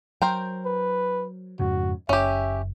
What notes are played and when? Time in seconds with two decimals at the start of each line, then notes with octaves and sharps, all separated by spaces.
0.22 F#3 A#4 C5 G5
0.65 B4
1.60 F2 G#2 C#3 F#4
2.09 F#1 C#4 G4 E5